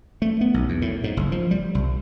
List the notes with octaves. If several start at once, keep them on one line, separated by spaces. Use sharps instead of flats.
A3
B3
B1
E2
A2
G#2
F#1
F3
G3
C2